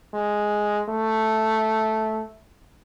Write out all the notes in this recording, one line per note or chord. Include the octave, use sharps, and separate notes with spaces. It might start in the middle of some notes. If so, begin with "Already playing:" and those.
G#3
A3